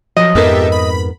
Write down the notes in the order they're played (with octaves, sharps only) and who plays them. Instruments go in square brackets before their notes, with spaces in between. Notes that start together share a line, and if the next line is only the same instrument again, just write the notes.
[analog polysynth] F3 [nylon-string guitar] F#3 [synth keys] D#5
[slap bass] F2 G#2 [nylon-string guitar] B3 A#4 [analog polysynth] G4 A4 E5
[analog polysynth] B5